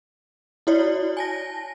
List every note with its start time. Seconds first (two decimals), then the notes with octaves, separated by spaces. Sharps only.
0.67 E4 F#4 C#5 D5
1.17 G#5 A5 A#6